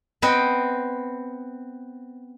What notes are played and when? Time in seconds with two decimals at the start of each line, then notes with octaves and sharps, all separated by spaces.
0.22 B3 C4 B4 C5 D#5 G5